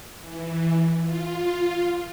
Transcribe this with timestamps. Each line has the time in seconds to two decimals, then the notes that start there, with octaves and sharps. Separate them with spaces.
0.20 E3
1.02 F4